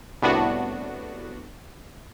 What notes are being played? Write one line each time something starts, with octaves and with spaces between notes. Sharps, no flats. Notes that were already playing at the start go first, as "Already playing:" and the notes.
C2 A2 B3 D4 F#4